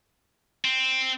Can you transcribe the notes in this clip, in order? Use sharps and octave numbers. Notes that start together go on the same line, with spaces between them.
C4